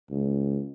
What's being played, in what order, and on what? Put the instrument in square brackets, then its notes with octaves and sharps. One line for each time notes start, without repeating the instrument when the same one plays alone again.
[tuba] C#2